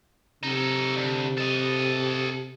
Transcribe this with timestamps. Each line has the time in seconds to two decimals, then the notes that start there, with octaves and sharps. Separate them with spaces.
0.43 C3 D#4 A4
0.95 D2
1.37 A4 D#5